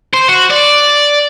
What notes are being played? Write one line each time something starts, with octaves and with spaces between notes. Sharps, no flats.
C5
F#4
D5